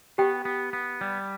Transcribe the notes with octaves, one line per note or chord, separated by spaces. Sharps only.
B3 G4 G5
B3
B3
G3